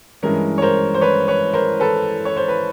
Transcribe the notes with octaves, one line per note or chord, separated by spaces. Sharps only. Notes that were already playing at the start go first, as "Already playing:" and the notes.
G2 E3 G#3 C#4 A#4
C#5
A#4 C5
C5
B4 C#5
B4 C#5
A#4 C5
A4 B4
C#5
C5
B4